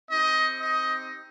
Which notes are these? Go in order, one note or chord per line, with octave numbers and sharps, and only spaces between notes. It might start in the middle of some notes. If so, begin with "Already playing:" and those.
C4 D#4 G4 D#5
D#5